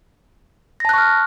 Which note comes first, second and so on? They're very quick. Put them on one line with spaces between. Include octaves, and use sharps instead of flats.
A#6 A5 F#6 C#6 F6